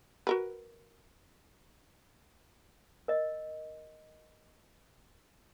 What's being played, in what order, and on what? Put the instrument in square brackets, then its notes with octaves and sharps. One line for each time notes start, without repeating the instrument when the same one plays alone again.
[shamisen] F#4 A#4 B4
[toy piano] A#4 D#5